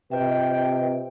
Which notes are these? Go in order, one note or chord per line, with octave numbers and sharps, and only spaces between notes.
C3 F4 B4 D#5 E5 G5